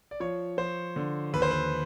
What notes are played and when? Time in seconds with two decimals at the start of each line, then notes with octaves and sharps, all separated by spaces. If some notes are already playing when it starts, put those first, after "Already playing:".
0.11 D5
0.20 F3 C#5
0.58 F3 C5
0.96 D3
1.33 D#2 B4
1.42 C5
1.51 B4